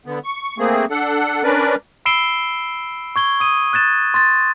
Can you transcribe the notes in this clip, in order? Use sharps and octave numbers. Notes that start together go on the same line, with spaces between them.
D3 B3
C#6
A3 A#3 C4 G#4
D4 A4 F#5
C#4 D4 A#4 B4 D5
B5 E6 C7 D7 E7 G7
C#6 G#6 G7
D#6 D#7
F#6 G#6 A6 E7
C6 A6